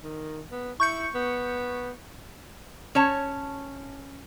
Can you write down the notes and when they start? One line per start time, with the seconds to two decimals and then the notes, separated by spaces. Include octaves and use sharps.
0.04 D#3
0.52 B3
0.80 E4 C#6 G6 C#7
1.15 B3
2.95 C#4 C#5 A5